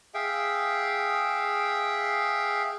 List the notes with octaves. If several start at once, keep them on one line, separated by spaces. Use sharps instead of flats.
G#4 E5 F5 G5